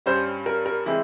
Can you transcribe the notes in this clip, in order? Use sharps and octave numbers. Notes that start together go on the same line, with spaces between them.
G2 G3 C#4 C5
A#4
A#4
E3 G#3 C4 E4